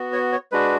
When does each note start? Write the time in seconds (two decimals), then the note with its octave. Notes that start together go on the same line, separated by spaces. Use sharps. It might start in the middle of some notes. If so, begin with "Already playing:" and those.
Already playing: B3 F#4
0.13 C#5
0.32 C#5
0.52 G#3 D4 F#4 B4